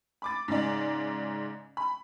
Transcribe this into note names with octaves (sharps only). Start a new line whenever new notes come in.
B5 D6 A6
G#2 C#3 D5
B5